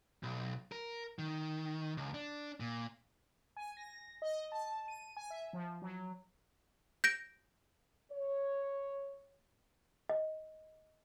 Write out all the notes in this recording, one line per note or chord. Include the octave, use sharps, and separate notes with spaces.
B1
A#4
D#3
C#2
D4
A#2
G#5
A#6
D#5
A5
D#7
G#5
E5
F3
F#3
G6 A#6 D7
C#5
D#5